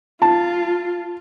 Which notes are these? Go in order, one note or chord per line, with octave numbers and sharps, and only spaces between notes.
F4 A5